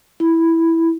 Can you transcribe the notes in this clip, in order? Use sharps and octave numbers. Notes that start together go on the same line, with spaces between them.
E4